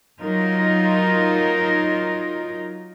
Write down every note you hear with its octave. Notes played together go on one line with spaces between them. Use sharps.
F#3 D#4 F4 A#4